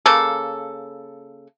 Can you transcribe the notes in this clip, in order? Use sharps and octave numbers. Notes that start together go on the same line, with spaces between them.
C#3 A#3 A4